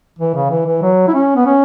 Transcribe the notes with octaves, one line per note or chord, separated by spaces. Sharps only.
E3
C#3
E3
E3
F#3
E4
C#4
B3
C#4